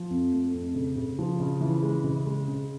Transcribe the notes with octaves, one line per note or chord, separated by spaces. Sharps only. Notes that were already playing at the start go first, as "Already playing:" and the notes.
Already playing: F3
F2
A3
F2
C#3
C#3
F3
C#3
E3
G#3
C#3
G#3
C#3